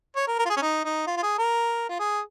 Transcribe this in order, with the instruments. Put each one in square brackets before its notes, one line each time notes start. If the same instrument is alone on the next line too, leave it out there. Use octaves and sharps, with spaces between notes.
[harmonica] C#5
A#4
A#4
F4
G#4
C#4
D#4
D#4
F4
F4
G#4
A#4
F4
G#4